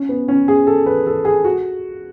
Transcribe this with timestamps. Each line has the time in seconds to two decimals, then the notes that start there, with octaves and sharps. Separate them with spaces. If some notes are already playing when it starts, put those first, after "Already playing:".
Already playing: C#4
0.09 B3
0.28 C#4
0.48 G#4
0.67 A4
0.86 B4
1.06 A4
1.25 G#4
1.45 F#4